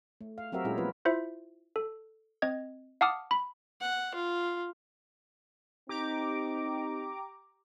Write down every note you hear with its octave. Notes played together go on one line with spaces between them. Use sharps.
A3
F5
F#3 C4 F#4 G4 A#4 E5
A#2 G#3 C#4 E4 F4 G#4
F3 B3 E4 F4 B4
E4 F4 C5 E5
A4
C4 D#5 G#6
F5 F#5 A5 D6 D#6 F6
B5
F#5
F4
C4 D#4 G4 A#5 D6